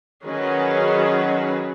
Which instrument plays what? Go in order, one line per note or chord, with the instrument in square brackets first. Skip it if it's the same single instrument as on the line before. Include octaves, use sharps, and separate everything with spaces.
[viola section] D#3 F#3 C#4 G#4 B4